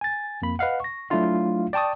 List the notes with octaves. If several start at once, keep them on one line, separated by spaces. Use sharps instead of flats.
G#5 A6
F2 A#3 B5
B4 D#5 F5 F#5
C#6 A#6
F#3 A3 D4 E4 F4 F5
D5 G5 A5 C#6 D#6